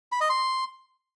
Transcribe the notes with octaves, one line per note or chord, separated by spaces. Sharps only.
B5
D#5
C6